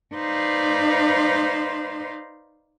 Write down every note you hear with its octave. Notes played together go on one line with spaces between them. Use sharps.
D#4 B4 C5 D5 F5 C6